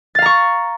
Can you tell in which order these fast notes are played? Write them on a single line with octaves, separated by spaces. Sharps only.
A6 F5 A#5 C#6